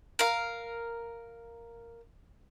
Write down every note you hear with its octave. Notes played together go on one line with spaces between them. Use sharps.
A#4 F5